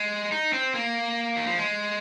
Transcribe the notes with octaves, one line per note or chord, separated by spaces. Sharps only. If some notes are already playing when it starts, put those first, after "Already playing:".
Already playing: G#3
D#4
C4
A#3
D#3
F3
G#3